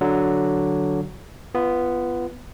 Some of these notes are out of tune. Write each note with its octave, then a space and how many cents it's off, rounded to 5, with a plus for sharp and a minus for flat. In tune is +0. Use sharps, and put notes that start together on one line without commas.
D3 +0 F#3 +5
B3 +0 F4 -25